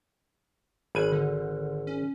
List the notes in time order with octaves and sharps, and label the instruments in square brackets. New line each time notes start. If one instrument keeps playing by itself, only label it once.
[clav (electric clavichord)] G#1 G#5 [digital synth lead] B5
[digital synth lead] D3
C#4